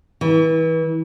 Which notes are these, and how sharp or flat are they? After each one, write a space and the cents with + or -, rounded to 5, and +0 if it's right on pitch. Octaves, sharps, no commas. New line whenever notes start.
E3 -30